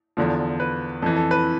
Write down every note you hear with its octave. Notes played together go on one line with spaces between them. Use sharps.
E2 D3 F3
B4
F2 E3 A4
A4
B4